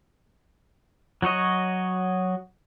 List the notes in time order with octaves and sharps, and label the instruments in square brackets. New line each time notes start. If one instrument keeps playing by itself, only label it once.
[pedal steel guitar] F#3 F#4 C#5 D#5